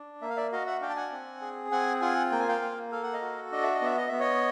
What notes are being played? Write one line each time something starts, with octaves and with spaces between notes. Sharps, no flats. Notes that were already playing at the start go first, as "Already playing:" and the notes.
Already playing: D4
A#3 E5
F5
D5 E5
F#4 D#5 F5
E5 F#5
D4 F5 G5
A5
F#5 G#5
C4
G#4
C4 F#5 G#5
F4 F#5 G#5
A#3 G5
G#5
F5 G5
A#3
A4 F5
F#5
D#5 F5
F#4
D4 D#5
E5
D#5
B3 E5
D#5
B3 E5
C#5 D#5